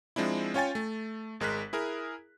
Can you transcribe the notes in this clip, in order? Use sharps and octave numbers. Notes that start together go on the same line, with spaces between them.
F3 G#3 C4 D4 E4
C#4 F4 C#5 G5 G#5 A6
A3
G#1 G#3 A#4 F#6 B6
E4 G#4 A#4